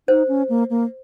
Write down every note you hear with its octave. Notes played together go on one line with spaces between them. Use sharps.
D#4 C5
C#4
A#3
A#3